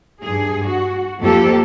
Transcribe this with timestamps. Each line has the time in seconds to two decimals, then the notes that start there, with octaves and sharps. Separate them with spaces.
0.22 G2 G#4
0.66 F#4
1.21 F2 F3 A#3 G4 A4